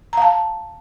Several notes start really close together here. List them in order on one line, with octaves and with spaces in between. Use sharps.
A#5 F5 A5